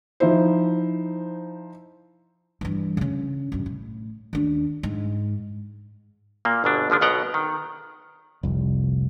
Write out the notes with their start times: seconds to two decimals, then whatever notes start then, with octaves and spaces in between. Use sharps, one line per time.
0.20 F3 D#4 E4 C5
2.61 G2 E3
2.97 C#3 C#4
3.52 B1 G2
3.66 A2
4.33 D#2 D4
4.83 G#2
6.45 A#2 A#3
6.64 G1 B2 D4
6.90 G#1 D3 F3 D4
7.01 B1 B2 B3 F#5 G5 A#5
7.34 D#3
8.43 F1 C2